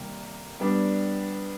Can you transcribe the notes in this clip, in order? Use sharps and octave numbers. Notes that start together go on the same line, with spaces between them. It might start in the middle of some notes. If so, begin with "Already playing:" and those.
Already playing: C3 D#3 G3 A#3
G3 B3 D4